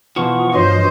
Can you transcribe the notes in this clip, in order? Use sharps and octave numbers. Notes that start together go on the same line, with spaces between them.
B2 E3 F3 F#5 C#6
G2 E3 F#4 C5 C#5 D#5 C6 D#6